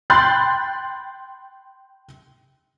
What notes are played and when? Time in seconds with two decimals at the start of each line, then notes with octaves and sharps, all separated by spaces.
0.10 G5 B5 C6 F#6 G6 A6